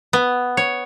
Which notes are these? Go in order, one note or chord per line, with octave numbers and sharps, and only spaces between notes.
B3
C#5